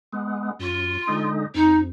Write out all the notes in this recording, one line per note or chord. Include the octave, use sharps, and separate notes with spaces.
G#3 B3
F#2 F4
D3 G#3 D#4
F2 D#4